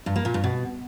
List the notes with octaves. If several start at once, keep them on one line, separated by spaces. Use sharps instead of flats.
G2
A#3
A#2
G2
B2